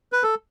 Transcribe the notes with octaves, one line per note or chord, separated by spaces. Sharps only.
B4
A4